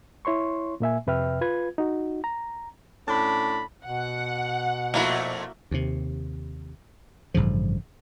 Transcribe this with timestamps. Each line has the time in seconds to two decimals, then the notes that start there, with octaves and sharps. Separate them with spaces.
0.25 E4 C#5 C6 C#6
0.80 A#2 A#3 E5 G#5
1.07 F2 C3 B4 E5 G5 F6
1.41 F4 B4 G#6
1.78 D#4 F#4
2.24 A#5
3.07 A2 C#4 D4 A5 B5
3.85 B2 F#5
4.94 F2 A#2 A3 A#3 E4 F#4
5.71 D#2 C3
7.34 A1 G2 C#3 F3